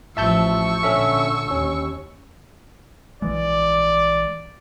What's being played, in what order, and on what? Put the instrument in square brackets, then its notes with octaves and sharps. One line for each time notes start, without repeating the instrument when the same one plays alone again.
[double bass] A1 F3 [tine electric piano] E5 A5 G6 [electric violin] C#6 E6
[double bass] A#2 D3 [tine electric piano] C#4 A4 E5
[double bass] D#2 [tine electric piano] C#4
[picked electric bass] A#1 E3 G#3 [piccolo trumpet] D5